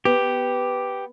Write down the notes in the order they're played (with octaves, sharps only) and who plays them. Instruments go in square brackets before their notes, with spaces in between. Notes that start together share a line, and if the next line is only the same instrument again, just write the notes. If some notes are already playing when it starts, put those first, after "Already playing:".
[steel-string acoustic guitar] B3 [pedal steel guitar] G4